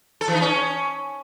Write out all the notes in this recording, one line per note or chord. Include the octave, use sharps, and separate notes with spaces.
A4
E3
D#4
C#4